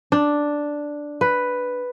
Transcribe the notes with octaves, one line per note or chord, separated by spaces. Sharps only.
D4
B4